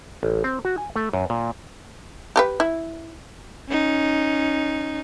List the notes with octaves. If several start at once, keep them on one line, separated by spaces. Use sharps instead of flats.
A1
C4
F#4
G#5
A3
F#2
A#2
G4 A#4 B4
E4
C#4 D#4